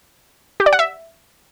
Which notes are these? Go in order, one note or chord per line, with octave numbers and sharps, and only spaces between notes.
G4
D5
F#5
E5